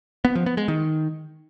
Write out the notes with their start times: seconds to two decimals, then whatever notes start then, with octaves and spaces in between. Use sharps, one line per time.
0.25 B3
0.35 F3
0.46 B3
0.57 G#3
0.68 D#3